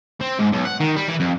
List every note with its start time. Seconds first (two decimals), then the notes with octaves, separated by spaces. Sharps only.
0.21 C4
0.39 G#2
0.53 B1
0.65 F#5
0.80 D#3
0.96 G3
1.08 E3
1.20 F2